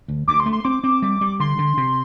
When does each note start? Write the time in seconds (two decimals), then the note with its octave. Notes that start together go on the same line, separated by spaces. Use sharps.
0.08 D2
0.28 D2 D6
0.40 C6
0.46 A3
0.52 C6
0.65 C4 D6
0.84 C4
1.02 G3
1.21 G3
1.40 D3 C6
1.59 D3
1.77 C3